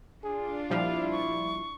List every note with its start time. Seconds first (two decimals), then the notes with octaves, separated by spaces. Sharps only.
0.23 D4 F4 G#4
0.70 A#2 F3 G3 E4 F5
1.12 C#6